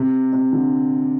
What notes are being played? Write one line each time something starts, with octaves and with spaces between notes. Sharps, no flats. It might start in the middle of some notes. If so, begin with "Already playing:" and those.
Already playing: C3
C3
D3